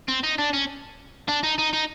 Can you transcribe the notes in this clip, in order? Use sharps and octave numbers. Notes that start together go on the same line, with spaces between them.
C4
D#4
D4
C#4
D4
D#4
D#4
D#4